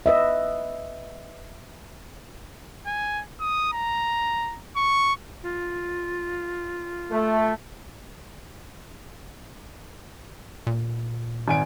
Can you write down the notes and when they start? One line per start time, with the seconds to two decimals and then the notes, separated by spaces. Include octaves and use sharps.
0.06 B4 D#5 E5
2.87 G#5
3.41 D#6
3.73 A#5
4.77 C#6
5.43 F4
7.11 A3
10.67 A#2
11.48 G#1 G#5 D7